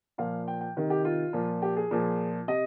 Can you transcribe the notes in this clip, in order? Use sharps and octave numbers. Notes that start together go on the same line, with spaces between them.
A#2 F3 F5
G5
G5
C3 D#3
G4
F4
A#2 F3
G4
G#4
A#2 F3
C3 D#5